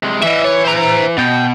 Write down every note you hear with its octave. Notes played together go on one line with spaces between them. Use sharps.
C3 G#3
E3 D#5 E5
C#5
C5 A#5
B2 G5